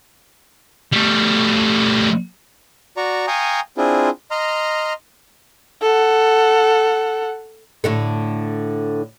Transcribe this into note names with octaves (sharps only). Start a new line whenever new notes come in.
G3 A3
F#4 D5 A#5 C#6
F5 G5 G#5 A#5 C#6 D#6
C4 D4 E4 F4 G#4
D#5 A#5 C6 F6
A4 F#5
A2 D3 A4